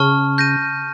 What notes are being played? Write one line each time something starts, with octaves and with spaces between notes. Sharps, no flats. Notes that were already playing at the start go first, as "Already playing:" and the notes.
Already playing: C#3 A5 C#6 F6
G6 A#6 D#7